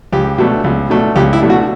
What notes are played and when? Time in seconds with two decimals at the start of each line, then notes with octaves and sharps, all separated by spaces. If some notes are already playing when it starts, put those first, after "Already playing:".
0.12 C#2 G4
0.38 B2 F#3 A3 D4
0.64 C#2
0.90 B2 F#3 A3 D4
1.16 C#2 G4
1.33 E4
1.41 B2 F#3 A3 D4
1.50 F#4